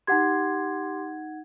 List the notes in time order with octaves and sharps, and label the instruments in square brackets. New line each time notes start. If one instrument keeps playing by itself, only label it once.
[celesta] D#4 F#5 G#6 [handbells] G4 C6